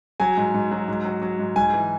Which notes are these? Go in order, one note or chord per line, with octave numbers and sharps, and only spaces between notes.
F#3 G#5
G#2
G#2
F#3
G#2
F#3
F#3
G#2
G#2 G#5
E3